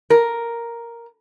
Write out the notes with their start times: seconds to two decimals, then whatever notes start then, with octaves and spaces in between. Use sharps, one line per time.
0.10 A#4